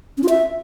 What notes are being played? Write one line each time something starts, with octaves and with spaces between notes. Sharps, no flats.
C#4
F4
E5